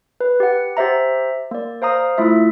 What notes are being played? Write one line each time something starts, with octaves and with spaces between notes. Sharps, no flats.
B4
G4 F#5
G4 C5 E5 A#5
A#3 D5
C5 F5 A#5 D#6
A3 E4 F4 E5